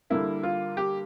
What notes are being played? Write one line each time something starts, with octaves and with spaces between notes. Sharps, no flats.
D3 G3 A#3 E4
F4
G4